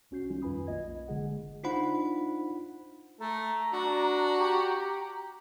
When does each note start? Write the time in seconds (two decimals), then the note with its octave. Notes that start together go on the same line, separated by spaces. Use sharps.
0.11 C2 C#4 F#4 G6 C7
0.30 D#3 G3 C#4 D#4 F4
0.42 F2 F4 B4 G#5 B5 D#6
0.67 B1 A#3 F4 D#5 G#6
1.08 G1 D3 G#3 G#4 F#5
1.64 D4 D#4 F4 C5 F#5 B5
3.20 A3 A4 A#5
3.73 D4 F#4
4.39 G4